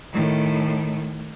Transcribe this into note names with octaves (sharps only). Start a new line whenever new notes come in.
A2 D#3